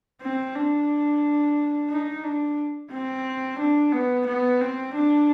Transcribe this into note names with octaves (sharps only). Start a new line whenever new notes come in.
C4
D4
D#4
D4
C4
D4
B3
B3
C4
D4